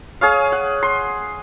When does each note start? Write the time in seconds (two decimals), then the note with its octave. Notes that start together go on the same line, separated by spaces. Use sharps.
0.21 G#4 C#5 F5
0.52 F#5
0.83 C6